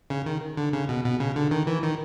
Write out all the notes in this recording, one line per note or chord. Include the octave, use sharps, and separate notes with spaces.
C#3
D#3
D3
C#3
B2
B2
C#3
D3
D#3
E3
D#3